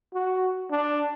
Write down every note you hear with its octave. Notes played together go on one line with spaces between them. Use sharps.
F#4
D4